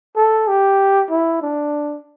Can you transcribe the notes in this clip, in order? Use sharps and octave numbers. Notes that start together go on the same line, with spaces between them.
A4
G4
E4
D4